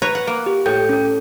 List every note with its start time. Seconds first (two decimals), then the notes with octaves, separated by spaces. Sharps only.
0.02 B4 C#5 A#5
0.15 F#5
0.27 A#3
0.46 G4
0.66 A2 A4 G5 G6
0.89 C#4 A4